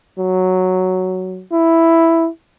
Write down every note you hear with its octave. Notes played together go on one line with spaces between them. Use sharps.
F#3
E4